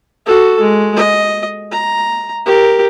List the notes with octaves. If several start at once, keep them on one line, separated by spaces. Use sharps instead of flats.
F#4 A4
G#3
D#5
A#5
G4 A#4